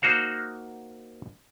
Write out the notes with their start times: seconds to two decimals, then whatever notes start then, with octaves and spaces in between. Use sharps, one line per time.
0.02 A#3 D#4 F#4 C5 F5